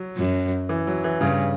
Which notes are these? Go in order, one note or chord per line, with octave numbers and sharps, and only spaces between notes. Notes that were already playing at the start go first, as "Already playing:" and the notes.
Already playing: F#3
F#2
E3
F#3
E3
G2 C#3